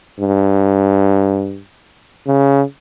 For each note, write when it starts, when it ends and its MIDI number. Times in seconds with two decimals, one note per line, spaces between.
0.20 1.61 43
2.27 2.63 49